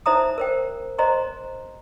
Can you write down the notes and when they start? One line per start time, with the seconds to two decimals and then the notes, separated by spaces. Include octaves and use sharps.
0.06 D#4 C5 E5 A#5 D#6
0.38 A#4 C5 G5
0.98 C5 D#5 A#5 C6